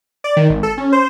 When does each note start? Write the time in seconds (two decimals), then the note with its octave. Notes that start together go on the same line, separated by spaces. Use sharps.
0.24 D5
0.37 D#3
0.50 G#1
0.63 A4
0.78 C#4
0.92 C5